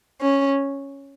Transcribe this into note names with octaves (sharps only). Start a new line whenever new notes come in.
C#4